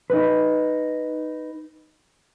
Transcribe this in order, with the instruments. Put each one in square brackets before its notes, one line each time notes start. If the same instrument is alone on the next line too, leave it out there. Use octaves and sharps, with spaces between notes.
[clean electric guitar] D#4 B4